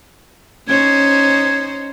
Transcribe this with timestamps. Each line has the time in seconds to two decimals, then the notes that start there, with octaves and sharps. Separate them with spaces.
0.68 C#4 D#4 C5 G#6